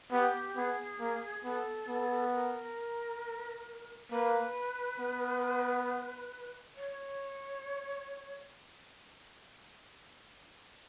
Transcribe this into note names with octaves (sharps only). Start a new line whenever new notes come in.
B3 G4
B3 G#4
A#3
B3 A4
B3
A#4
A#3 B4
B3
C#5